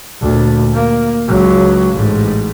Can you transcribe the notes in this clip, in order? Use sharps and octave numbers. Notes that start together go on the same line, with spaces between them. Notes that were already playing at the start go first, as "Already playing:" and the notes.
D2 A#2
A#3
C#2 F#3
A1 G#2